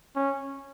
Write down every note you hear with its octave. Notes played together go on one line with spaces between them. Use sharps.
C#4